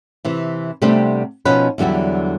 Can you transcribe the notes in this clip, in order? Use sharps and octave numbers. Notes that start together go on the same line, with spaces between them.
C3 E3
C3 G3 A3 B3 C4 D4
B2 F3 B3 C#4 D#4 B4
E2 D3 F#3 G3 E4